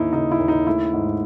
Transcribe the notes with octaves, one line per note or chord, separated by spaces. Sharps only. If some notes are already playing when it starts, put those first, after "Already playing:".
Already playing: D#2 E3 D#4 E4
C#3 D#4
E4
D#2
D#4
A3 E4
G#2